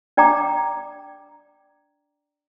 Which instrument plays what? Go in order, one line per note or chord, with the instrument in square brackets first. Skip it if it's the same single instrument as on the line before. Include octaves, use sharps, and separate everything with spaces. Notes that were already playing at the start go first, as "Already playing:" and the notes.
[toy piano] D4 D5 G5 A#5 D6